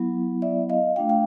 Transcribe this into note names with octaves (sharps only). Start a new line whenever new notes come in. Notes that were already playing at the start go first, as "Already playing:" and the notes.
Already playing: F#3 B3 E4
D5 E5
D#5 F5
A3 D4 F4 F5 G5
F5 G5